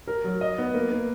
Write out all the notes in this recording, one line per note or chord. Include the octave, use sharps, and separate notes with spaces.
A#4
F#3
D#5
B3
A#3
A#3